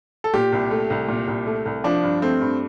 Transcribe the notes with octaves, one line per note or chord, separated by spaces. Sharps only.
A4
A#2 G4
C2
A3
C2
A#2
C2
A3
C2
F3 D4
G2
A3 C4
G2